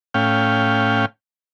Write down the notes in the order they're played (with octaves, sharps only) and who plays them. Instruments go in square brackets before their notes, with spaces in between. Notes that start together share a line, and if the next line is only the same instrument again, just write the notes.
[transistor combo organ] A2 C#4 F5 G5